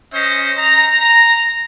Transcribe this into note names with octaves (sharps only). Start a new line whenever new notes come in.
C#4 C5 D#5
A#5